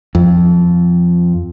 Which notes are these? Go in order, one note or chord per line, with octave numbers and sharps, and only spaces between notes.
F2